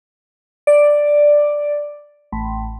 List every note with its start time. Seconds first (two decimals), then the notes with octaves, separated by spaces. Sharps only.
0.67 D5
2.32 A1